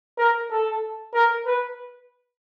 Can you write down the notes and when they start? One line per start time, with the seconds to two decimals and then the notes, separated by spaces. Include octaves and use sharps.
0.18 A#4
0.51 A4
1.14 A#4
1.46 B4